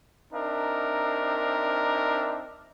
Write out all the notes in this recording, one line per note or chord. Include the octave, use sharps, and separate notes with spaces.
C4 D4 D#4 A#4 E5